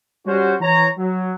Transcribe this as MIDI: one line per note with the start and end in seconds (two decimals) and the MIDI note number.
0.26 0.55 55
0.26 0.55 61
0.26 0.55 66
0.26 0.55 72
0.61 0.88 52
0.61 0.88 73
0.61 0.88 82
0.97 1.33 54